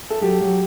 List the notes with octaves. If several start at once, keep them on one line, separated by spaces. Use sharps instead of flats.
A4
F#3 G4
F#3